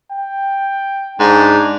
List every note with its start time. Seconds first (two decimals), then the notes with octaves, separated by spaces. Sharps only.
0.12 G5
1.20 G#2 D4